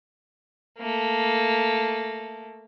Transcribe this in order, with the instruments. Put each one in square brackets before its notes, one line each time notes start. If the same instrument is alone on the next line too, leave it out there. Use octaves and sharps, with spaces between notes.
[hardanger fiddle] A3 A#3